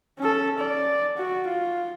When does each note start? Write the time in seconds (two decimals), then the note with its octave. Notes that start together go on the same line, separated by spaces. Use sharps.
0.19 C#4 A4
0.59 D5
1.17 F#4
1.48 F4